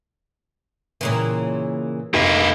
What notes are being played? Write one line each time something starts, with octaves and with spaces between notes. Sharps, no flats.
A#2 C#3 E3
F1 A#3 B4